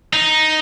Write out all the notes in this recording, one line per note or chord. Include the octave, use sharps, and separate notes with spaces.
D#4